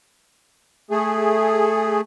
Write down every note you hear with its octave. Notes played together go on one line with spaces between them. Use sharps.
A3 G#4